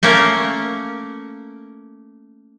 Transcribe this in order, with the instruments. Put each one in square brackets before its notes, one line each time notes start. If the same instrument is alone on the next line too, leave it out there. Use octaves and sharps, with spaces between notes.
[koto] A3 A#3 C#4 A#4